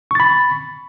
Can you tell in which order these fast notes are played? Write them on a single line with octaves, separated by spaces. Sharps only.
C#6 A6 B5